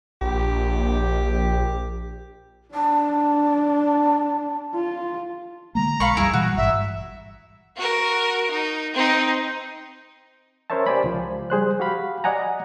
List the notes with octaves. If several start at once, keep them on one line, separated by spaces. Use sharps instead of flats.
A#1 G4
D4 A5
F4
D3 G#3 A#3 A#5
B1 F5 B5 C#6
F2 G3 E4 G#4
A#2 E3 G3 F#4
G#1 G2 E5
F#4 A#4
D#4
C4 D#4
C#4 A#4 C5 C#5 E5 A5
G4 C5 D5 G#5 B5
C#2 F3
G3 G#4 C5 F#6
F#4 G4 F5 B5
D5 D#5 F#5 G#5 A#5